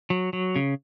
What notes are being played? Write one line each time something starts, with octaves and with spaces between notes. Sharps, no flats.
F#3
F#3
C#3